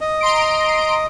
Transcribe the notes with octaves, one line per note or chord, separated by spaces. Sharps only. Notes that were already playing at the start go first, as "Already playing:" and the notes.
D#5
A#5 C6 D7